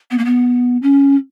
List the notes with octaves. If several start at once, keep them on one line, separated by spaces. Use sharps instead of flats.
B3
A#3
B3
C#4